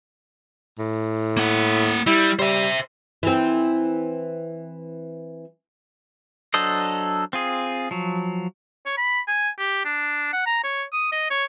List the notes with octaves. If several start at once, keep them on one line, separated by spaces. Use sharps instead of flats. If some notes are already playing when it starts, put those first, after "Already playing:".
A2
A#3 F#5
G3 E4
G3 C5 E5
E3 C4
F#3 D4 A4 C5 D#5
C4 F4 G#4
F3 F#3
C#5
B5
G#5
G4
D4
F#5
A#5
C#5
D#6
D#5
C#5